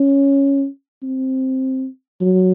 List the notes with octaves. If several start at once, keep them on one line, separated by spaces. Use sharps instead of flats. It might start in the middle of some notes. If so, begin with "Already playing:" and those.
Already playing: C#4
C4
F#3